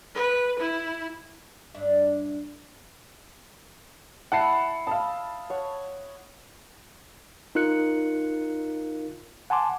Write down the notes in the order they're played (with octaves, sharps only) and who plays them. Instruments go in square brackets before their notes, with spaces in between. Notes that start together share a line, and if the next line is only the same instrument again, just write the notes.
[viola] B4
E4
[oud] G2 D4 E5
[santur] E4 [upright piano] F#5 A5 C7
[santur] D#5 B5 E6 [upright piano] F5 A5
[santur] C#5 F#5
[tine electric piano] D#4 F4 A#4 F#6 C#7
F#5 G#5 A5 C6 D6